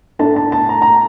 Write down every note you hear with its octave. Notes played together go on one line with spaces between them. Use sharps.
A2 A3 D4 A5
A5
A5
A#5
A#5